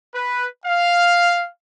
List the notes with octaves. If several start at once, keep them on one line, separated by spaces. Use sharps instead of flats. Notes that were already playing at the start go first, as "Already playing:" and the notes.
B4
F5